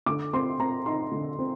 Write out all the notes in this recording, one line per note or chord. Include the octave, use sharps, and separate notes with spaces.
D3 D6
C4 C6
C4 A#5
D#4 C6
D3
C4